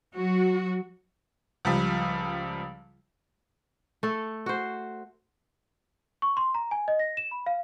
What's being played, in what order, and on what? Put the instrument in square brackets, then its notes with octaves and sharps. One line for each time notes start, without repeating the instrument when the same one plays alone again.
[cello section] F#3 F#4
[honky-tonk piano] C#2 F3 G3
[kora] A3 A4
F#4 C5
[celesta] C#6
C6
A#5
G#5
D#5
A#6
E7
B5
F5